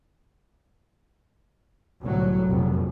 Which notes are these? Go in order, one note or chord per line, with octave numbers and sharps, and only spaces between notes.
G1 C2 A2 F#3
F1 A#1 F#2